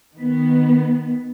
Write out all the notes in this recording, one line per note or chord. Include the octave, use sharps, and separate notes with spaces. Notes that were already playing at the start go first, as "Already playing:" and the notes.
D#3 B3